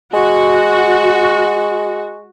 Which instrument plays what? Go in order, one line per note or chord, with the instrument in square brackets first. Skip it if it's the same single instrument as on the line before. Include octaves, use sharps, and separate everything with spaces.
[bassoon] G#3 [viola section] F#4